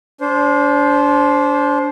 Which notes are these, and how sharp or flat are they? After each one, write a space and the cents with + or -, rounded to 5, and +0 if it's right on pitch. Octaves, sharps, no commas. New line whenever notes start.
D4 -30 C5 +0